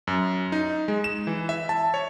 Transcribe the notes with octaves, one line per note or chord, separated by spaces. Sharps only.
F#2
D#4
G#3
E7
E3
E5
A5
C#5